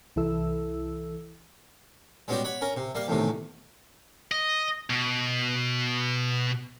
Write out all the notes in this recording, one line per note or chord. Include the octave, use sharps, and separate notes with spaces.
C2 E3 E4 A4 E6
G3 G#3 B3 C#4 F#4 G4
C#5 F#5 B5
C#4 A#4
C3
G3 A#3 F5
E2 A2 C3 D#3
D#5
B2